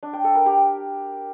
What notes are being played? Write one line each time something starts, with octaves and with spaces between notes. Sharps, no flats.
D4
G5
A4
A#4
G4